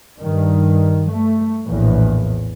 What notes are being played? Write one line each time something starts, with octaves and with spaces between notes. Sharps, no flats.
G2 D#3
A3
A#1 E2 A2